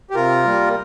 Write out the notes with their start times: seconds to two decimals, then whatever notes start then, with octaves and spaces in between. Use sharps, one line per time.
0.10 G4
0.15 C3 F4 A#4
0.45 G3 A#3